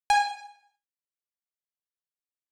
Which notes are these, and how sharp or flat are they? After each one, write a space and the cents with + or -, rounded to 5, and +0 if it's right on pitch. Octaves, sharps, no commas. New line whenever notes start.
G#5 -20